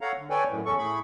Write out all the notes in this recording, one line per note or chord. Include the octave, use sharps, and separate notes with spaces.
A4 C#5 F5 F#5 A#5
D3
A4 B4 C#5 D5 G5 G#5
F#2 A2
E2 C#4 A4 C#6
A2 A3 G#4 B5 C#6